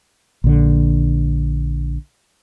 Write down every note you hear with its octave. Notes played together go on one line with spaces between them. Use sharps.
A#1 D3